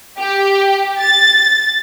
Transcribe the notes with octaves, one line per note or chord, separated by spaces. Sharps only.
G4
A6